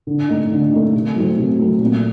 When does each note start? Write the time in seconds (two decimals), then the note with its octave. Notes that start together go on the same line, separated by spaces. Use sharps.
0.07 D3
0.28 A3 D#4
0.51 D3
0.72 A3 D#4
0.93 C3
1.16 F#3 A3 C4
1.37 C3
1.59 F#3 A3 C4
1.80 A#2